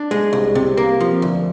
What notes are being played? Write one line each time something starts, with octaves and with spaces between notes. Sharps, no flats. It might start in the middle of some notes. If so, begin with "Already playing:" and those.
Already playing: D4
G#3
C2
C3
A#3
F3
D2